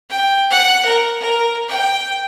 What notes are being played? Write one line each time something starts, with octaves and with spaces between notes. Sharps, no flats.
G5
F#5
A#4
A#4
G5